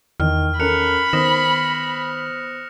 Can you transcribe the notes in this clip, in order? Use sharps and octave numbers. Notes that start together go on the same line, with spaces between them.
E2 D#3 F6
C#4 A4 A#4 B5 F#6 C#7 F7
D#3 B3 C5 D#6 A#6 E7